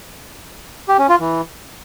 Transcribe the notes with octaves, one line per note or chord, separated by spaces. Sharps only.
G4
C#4
F4
E3